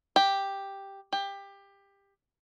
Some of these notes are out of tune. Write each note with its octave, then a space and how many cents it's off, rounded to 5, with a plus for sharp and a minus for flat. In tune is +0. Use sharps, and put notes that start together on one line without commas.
G4 +5
G4 +20